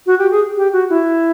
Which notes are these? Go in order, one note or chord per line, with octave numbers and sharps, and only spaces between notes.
F#4
G4
G#4
G4
F#4
E4